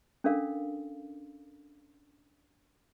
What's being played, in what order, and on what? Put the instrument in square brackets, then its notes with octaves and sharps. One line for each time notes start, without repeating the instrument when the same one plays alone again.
[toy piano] C#4 D4 A4 A#4 F5